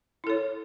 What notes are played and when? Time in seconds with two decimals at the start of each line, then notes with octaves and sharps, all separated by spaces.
0.24 E4
0.27 A4
0.30 C#5